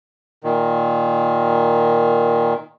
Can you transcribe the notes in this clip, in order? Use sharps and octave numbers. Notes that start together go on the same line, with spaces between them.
A#2 D#3